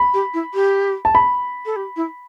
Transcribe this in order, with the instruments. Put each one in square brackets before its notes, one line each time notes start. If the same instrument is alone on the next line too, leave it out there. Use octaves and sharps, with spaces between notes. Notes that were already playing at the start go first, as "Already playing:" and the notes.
Already playing: [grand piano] B5
[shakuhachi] G4
E4
G4
[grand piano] A5
B5
[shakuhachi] A4
G4
E4